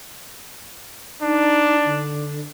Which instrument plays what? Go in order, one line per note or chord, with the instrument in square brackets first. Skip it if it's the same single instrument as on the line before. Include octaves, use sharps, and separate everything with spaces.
[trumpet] D4 [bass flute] D#4
[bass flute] D3